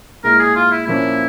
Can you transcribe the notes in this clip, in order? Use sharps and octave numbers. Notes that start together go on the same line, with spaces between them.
A#2 G#3 E4 A#4
G#4
F4
E4
A#2 F3 A#3 C#4 E4